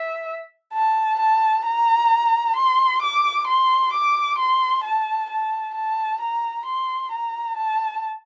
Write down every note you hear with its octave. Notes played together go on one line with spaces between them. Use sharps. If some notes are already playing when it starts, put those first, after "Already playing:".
Already playing: E5
A5
A5
A#5
C6
D6
C6
D6
C6
A5
A5
A5
A#5
C6
A#5
A5